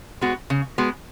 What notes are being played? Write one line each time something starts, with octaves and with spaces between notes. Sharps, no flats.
G#3 B3 F#4
C#3
G#3 B3 F#4